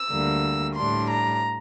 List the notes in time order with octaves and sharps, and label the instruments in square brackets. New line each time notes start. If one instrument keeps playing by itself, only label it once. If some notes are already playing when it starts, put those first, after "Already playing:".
Already playing: [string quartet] E6
D2 D3 G3 A#3
A2 G3 D4 C6
A#5